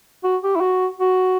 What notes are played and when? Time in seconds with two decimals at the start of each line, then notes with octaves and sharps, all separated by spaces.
0.24 F#4
0.42 G4
0.56 E4
0.61 F#4
0.99 F#4